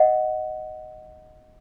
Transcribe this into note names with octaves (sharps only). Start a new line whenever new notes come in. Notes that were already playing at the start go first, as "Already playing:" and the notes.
Already playing: D#5 F#5